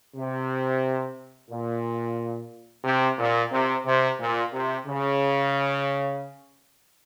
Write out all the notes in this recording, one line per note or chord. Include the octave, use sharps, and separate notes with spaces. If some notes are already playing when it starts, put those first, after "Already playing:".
C3
A#2
C3
A#2
C3
C3
A#2
C3
C#3